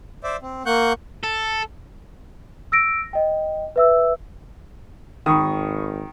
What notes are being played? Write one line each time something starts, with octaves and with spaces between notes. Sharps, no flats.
C5 D5 E5
C4
A#3 F#5 C#6 F#6 G6
A4
E6 A#6 D7
D#5 G5
B4 E5 E6
G#1 D#3 B5 C#6 D#6